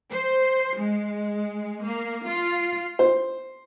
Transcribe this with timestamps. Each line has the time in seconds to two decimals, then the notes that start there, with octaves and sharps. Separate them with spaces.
0.11 C5
0.77 G#3
1.85 A#3
2.25 F4
2.99 C5